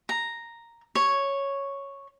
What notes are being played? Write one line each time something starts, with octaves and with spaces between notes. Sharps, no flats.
A#5
C#5